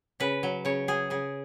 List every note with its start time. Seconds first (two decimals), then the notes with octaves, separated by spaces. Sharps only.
0.20 C#3 B4
0.43 F#3
0.65 C#3 C#5
0.88 F#3 G#4
1.10 C#3 G#4